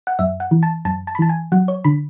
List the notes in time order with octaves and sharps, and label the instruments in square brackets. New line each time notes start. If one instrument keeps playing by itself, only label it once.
[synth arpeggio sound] F#5
F#2 E5
F#5
E3
A5
F#2 A5
A5
B5
E3 A5
G#5
F#3 F#5
C#5
D3 B5